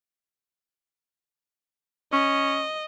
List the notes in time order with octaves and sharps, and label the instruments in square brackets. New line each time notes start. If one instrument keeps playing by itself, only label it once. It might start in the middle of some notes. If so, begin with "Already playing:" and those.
[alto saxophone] C#4 [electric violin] D#5